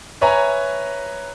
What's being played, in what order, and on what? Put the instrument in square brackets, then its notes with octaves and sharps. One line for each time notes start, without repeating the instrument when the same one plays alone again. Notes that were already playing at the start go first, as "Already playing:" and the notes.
[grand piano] B4 C#5 E5 G#5 A#5